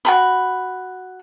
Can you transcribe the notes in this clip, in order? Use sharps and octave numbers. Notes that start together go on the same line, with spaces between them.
F#4 G#4 B5